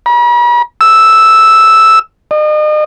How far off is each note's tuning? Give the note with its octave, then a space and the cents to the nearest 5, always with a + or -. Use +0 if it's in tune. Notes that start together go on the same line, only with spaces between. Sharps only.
B5 -45
E6 -5
D#5 -40